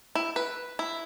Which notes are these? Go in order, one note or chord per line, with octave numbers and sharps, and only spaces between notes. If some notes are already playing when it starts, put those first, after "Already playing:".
E4
B4
E4